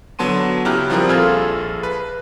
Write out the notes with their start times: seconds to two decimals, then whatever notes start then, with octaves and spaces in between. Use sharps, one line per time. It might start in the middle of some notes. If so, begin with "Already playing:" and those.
0.19 D3 F#3 B3 A5 C6 D#7
0.65 C#3 E4 G4 A#5 F6 F#6
0.90 F3 G3 C4 E4 G#4 A#4
1.09 A#1 F4 G#4 A4 F6 G#6
1.83 B4